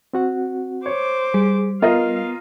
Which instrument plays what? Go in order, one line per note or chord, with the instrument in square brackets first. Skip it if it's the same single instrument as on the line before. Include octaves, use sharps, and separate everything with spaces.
[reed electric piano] C4 F#4 F#5
[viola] C5 D6 [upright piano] C#5
[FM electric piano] G3 [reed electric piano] G#4
[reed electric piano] B3 [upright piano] F4 A#4 D#5 [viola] F5